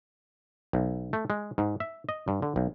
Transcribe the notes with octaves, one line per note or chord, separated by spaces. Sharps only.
B1
A3
G#3
G#2
E5
D#5
G2
D3
B1